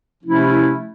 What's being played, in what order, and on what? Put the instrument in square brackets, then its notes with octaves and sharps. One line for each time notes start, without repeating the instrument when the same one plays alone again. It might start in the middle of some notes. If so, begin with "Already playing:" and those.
[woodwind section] C3 F3 A3 C#4 E4